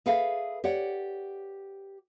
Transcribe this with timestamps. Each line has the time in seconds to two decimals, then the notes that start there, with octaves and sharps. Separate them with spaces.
0.06 G#4 A4 B4 E5 F5
0.64 G4 C#5 D5 F#5